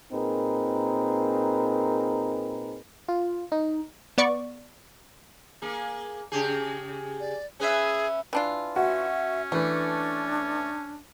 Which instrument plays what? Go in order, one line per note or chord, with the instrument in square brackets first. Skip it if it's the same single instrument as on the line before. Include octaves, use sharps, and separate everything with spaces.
[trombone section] A#2 C4 D#4 G#4 A#4 B4
[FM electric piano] F4
D#4
[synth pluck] B3 D5 C#6
[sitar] A#3 G#4
C#3 G4 G#4
[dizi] D5
[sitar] C#4 B4 E5 [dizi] G#4
[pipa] E3 D4 F4
[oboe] C#4 [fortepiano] F#4 [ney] E5
[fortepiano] E3 B4 [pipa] A3 [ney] D4